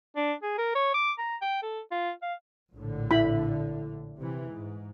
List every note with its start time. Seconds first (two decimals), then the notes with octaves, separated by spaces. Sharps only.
0.16 D4
0.43 G#4
0.58 A#4
0.75 C#5
0.94 D6
1.18 A#5
1.41 G5
1.63 A4
1.91 F4
2.22 F5
2.72 A#1 A2 D3
3.11 E4 B5
4.19 C3 E3
4.51 G#2